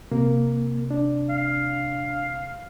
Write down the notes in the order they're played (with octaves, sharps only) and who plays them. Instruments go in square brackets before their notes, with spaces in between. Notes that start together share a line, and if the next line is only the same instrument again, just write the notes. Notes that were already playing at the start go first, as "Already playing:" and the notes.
[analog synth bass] C3 [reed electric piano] A#3
[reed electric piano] D4
[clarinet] F5